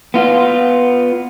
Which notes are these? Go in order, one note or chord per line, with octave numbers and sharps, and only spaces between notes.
B3 F4